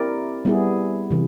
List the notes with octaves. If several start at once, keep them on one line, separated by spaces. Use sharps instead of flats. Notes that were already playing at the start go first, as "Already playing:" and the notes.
Already playing: C4 E4 G4 A#4 D5
G3 B3 E4 G#4
C3 E3